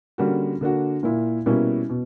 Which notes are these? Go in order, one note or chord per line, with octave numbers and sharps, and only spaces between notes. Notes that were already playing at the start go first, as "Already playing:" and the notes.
D3 G3 A#3 C#4 F#4
D3 A#3 D4 F#4
A#2 A#3 E4
B2 G3 A#3 C#4 E4
B2